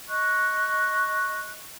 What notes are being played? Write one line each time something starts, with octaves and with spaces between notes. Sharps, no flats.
D#5 C#6 F#6